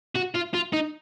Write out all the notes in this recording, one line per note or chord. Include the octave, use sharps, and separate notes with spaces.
F#4
F4
F4
D#4